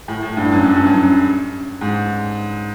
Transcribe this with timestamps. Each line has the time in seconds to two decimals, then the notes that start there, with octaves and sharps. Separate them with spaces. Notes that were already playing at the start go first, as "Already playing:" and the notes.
0.08 A2
0.23 A2
0.37 G2
0.52 F#2
0.65 F#2
0.76 G2
0.87 F#2
1.81 G#2